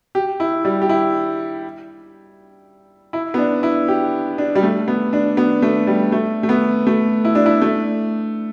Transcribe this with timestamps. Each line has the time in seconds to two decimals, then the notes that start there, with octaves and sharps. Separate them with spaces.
0.15 G4
0.40 E4
0.65 G3
0.81 G4
0.89 E4
3.13 E4
3.34 B3
3.38 D4
3.63 E4
3.88 G4
4.38 D4
4.55 G3
4.63 A3
4.88 B3
5.13 D4
5.37 B3
5.62 A3
5.87 G3
6.12 A3
6.43 A3
6.49 B3
6.87 A3
7.25 E4
7.35 D4
7.46 E4
7.62 A3